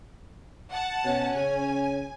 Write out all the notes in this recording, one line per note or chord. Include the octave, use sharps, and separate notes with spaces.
F#5 A5
B2 C#4 C#5
C#3 G#5